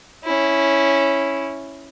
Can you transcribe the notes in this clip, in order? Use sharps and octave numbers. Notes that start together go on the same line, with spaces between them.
C#4 E4